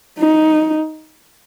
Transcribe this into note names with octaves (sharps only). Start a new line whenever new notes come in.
D#4